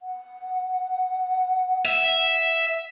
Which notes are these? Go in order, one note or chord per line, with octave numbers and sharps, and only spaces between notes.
F#5
E5